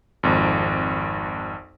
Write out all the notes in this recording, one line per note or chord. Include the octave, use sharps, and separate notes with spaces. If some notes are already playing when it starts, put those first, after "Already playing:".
G#1 F2